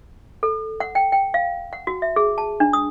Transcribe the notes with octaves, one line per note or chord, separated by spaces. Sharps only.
A4
F#5
G5
G5
F5
F#5
F#4
E5
G#4
A5
D4
D#6